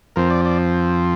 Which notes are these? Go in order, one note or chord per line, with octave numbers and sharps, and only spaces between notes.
F2 F3 C4 A#4
D5
D5